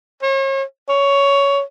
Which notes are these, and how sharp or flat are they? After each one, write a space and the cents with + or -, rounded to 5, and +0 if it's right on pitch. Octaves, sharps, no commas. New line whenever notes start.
C#5 -40
C#5 +10